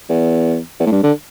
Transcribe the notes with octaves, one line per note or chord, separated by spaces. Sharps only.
E2
E2
A2
G2
D3